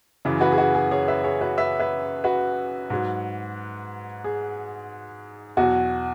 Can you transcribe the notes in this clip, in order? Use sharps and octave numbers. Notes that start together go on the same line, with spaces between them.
F#2 C#3 E3
F#4 B4
G#4
F#4
G#4
G#4 C#5
B4 E5
G#4 C#5
F#4 B4
B4 E5
B4 E5
F#4 B4
G#2 F#3
G#4
E2 B2 F#3 F#4